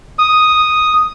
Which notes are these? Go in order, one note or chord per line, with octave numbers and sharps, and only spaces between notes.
D#6